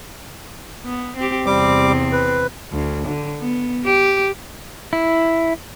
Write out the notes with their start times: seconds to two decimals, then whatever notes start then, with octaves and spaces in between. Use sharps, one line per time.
0.85 B3
1.17 C4 G4
1.46 E2 C3 G3 C4 D6
2.12 B4
2.72 D2
3.08 D3
3.40 B3
3.85 G4
4.93 E4